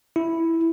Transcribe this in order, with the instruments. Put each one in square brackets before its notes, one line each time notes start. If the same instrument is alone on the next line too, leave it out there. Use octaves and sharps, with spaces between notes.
[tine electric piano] E4